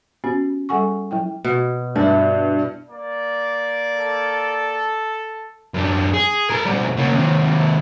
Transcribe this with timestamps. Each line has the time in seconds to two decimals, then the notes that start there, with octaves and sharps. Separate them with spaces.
0.24 B3 C#4 F#4 G4
0.69 G3 G#4 A4 F#5 G#5 C#6
1.11 F#3 E4 G5
1.44 B2
1.96 G2 D4 E4
2.90 A#3 D5
3.97 A4
5.74 F#2 D4
6.13 G#4
6.50 A4 A#4
6.66 B2 G3
6.98 C#3 A#3
7.13 D#2 C3